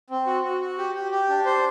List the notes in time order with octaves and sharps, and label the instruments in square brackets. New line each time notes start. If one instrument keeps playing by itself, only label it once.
[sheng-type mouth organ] C4
F#4
F#4
F#4
G4
G4
G4
D4
C5